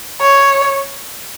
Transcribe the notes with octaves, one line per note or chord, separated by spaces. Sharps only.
C#5